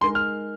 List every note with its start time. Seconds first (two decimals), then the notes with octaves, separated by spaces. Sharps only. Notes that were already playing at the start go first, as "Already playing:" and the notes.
0.01 G#3 D#4 A#4 C6
0.15 F6